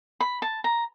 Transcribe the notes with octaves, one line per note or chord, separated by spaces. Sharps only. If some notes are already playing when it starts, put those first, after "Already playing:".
B5
A5
A#5